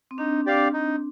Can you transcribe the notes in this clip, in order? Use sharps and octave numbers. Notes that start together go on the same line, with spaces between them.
C4
D4 D#4
G4 D5 F5
D#4